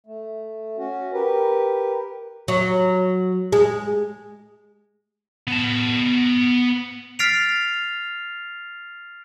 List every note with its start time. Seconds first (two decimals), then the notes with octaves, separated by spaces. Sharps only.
0.06 A3
0.77 C#4 F#4
1.13 G4 A#4 B4
2.48 F#3
3.52 G#3
5.47 B3 A5
7.19 F6 A6 B6 C7 D7 F7